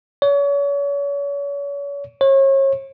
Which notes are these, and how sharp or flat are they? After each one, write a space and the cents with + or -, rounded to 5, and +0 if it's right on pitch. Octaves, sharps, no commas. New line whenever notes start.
C#5 +35
C#5 -35